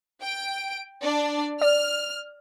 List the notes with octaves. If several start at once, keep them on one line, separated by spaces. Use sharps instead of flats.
G5 D7
D4 D5
D5 F6